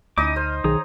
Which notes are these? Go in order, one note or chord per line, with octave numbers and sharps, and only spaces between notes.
D2 C#4 D#4 E4 D#5 D6 D#6
C5 F6
B1 D#3 G#4 C#5 A#5 D#6